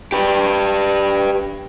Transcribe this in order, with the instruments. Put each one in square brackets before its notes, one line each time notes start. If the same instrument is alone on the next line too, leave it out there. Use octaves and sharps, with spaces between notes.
[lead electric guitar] G4 B4